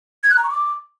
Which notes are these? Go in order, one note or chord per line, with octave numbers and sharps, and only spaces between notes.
G#6
F#6
A#5
C#6
D6